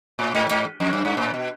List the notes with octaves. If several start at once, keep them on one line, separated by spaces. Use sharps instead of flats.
A2
G#2
G#2
F2
F#2
G2
A2
B2